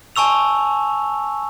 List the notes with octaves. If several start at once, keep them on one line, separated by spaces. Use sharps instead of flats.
G#5 A5 C#6 E6 F7